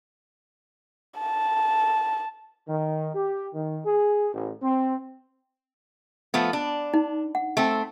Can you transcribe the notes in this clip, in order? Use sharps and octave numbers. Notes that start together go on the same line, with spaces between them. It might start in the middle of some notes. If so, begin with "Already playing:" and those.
A5
D#3
G4
D#3
G#4
A1
C4
F3 A3 B3
D4
D#4
F#5
A3 C4